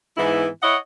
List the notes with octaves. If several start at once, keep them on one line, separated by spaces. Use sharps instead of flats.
G#2 E3 B3 E4
E4 C#5 D#5 F#5